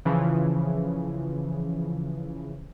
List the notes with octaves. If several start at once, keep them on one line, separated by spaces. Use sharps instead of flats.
C#3 E3 F3